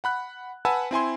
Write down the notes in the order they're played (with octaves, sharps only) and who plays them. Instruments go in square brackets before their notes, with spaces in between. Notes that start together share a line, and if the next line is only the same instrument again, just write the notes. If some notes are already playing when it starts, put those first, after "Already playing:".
[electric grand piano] F#5 B5 F#6
B4 F#5 G#5 A5 B5 E6
C4 E4 G#5 C6